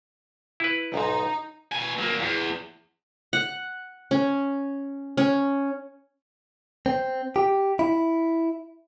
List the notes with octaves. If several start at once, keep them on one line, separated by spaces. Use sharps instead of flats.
E4 B4
B1 G#2 D#4
B2 G#5
F#3 A#3
E2
F#5
C#4
C#4
C4
G4
E4